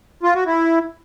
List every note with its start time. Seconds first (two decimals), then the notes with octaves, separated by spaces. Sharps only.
0.23 F4
0.35 F#4
0.46 E4